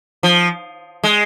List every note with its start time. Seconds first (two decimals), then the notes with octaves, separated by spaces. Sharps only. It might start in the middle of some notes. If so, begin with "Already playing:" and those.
0.23 F3
1.03 G#3